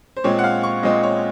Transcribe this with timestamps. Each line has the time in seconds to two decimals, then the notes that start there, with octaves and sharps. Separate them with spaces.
0.17 C5
0.24 A#2 G#3 C4 C#5
0.39 F#5
0.44 F5
0.63 C#6
0.83 A#2 G#3 C4 D#5
1.03 C#5